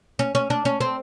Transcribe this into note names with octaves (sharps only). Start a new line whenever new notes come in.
C#4
C#4
D4
C#4
C4